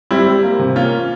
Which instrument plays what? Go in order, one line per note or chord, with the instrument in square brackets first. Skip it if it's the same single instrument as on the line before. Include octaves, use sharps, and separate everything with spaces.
[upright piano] G3 [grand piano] C4 E4
[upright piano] G3
A#3
C3
[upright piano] A#3 [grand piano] C#4 F4